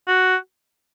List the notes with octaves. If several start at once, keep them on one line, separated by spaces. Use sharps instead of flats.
F#4